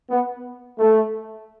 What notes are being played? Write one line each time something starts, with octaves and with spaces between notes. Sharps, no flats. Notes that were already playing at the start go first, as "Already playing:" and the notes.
B3
A3